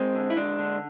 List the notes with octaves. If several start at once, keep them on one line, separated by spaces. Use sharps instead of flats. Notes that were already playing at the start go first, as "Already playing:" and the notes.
Already playing: G#3 C4
D3
E4
G#3 D4
D3